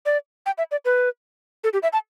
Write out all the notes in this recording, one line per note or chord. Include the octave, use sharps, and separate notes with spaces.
D5
G5
E5
D5
B4
A4
G4
E5
A5